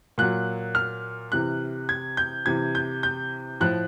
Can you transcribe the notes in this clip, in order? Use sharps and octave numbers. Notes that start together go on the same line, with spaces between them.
A#2 F#3 F#6
F6
C3 E3 F#6
G#6
G6
C3 E3 G#6
G6
G6
A2 F3 F#6